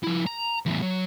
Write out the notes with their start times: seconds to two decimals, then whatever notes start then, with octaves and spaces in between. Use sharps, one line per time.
0.04 F3 E4
0.27 A#5
0.66 E2 A2
0.82 F#3